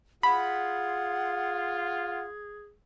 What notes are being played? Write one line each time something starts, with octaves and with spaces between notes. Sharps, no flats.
F4 G#4 F#5 B5